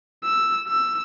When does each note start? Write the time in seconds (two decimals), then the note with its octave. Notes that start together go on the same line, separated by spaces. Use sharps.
0.24 E6
0.68 E6